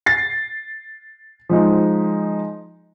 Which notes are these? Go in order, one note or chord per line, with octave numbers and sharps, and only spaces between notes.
A6 C7
F3 G#3 D#4